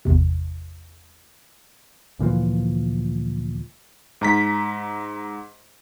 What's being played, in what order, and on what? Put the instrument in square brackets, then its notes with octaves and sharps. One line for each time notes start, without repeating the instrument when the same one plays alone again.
[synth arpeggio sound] G#1 E2 C3
[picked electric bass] D2 A#2 E3 F3
[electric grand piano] G#2 A#5 B6